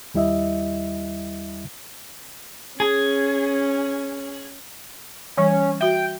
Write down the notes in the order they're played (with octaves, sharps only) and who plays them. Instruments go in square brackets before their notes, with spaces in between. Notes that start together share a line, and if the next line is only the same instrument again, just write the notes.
[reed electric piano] D#2 G3 E4 D#5 E5
[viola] C#4 [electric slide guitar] G#4
[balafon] E3 G3 C#5 [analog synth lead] C#4
[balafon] F#4 E5 [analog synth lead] G5